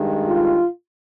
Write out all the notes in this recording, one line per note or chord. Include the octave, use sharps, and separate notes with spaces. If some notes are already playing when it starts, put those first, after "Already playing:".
Already playing: G2 D#3 G#3
F4